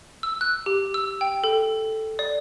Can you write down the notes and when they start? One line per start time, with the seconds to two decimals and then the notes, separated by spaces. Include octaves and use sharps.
0.23 E6
0.41 F#6
0.66 G4
0.94 E6
1.21 G5
1.44 A4
2.19 D5